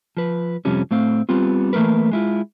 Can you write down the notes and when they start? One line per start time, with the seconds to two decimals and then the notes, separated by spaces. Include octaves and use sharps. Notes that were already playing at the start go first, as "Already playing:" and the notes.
0.17 F3 B4
0.65 F2 C3 F3 G3 C#4
0.91 A2 A3 C4 F5
1.29 G3 B3 C4 F4
1.73 E3 A3 A#3 A#4 B4
2.11 G#3 E4 F4